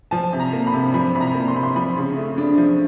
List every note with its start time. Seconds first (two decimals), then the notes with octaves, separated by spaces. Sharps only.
0.11 F3 A5
0.33 C3
0.39 A#5
0.53 A#3
0.67 B5
0.74 C3
0.94 F3 B5
1.15 C3 B5
1.21 A#5
1.34 A#3
1.48 C6
1.55 C3 B5
1.63 C6
1.76 F3 B5
1.96 C#3
2.16 A3
2.38 D4
2.58 F3